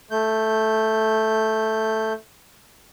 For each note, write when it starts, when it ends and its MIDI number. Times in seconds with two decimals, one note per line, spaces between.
0.11 2.13 57
0.11 2.13 91